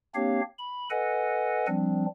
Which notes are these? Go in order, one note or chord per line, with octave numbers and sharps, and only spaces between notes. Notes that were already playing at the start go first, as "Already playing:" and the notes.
A#3 C4 D4 G4 C#5 F5
B5
A4 B4 D#5 F#5 G#5
F3 G3 C4 D4